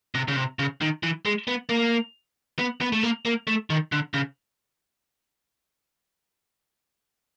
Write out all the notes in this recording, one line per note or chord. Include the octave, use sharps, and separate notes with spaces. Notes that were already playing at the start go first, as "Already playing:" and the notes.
C3
C#3
C3
C#3
D#3
E3
G#3
B3
A#3
B3
B3
A3
A#3
A#3
A3
D#3
D3
C#3